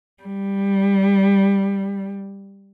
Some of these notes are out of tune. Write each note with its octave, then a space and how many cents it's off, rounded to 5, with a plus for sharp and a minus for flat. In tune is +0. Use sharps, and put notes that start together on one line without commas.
G3 +10